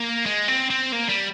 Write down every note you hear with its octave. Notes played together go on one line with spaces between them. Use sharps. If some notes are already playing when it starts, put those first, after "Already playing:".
Already playing: A#3
G#3
C4
C4
A#3
G3